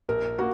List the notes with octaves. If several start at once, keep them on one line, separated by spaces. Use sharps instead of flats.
A#1 A#4
A#3 F#4